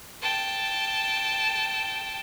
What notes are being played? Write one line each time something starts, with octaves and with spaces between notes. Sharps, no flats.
G5 A5